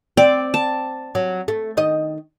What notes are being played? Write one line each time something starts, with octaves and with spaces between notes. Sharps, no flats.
C4 D5
A5
F#3
A3
D#3 D#5